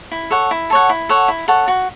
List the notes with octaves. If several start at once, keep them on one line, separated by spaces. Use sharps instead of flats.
E4
A4 C#5 F#5
E4
A4 C#5 F#5
E4
A4 C#5 F#5
E4
A4 C#5 F#5
F#4